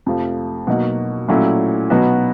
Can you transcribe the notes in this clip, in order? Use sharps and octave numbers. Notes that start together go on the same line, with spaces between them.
F2 C3 F3 A3
B2 F#3 A#3 D#4 F#4
A#2 F#3 A3 C#4 E4
B2 F#3 B3 D#4 F#4